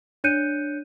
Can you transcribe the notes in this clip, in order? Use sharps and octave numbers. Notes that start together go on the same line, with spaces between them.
D4 C#5 F#6 G6 C#7 D#7